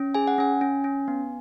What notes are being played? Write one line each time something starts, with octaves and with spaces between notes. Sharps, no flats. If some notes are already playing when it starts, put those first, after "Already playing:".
Already playing: C#4
G#4 G#5
F#5
C#4 G#5
C#4
C#4
B3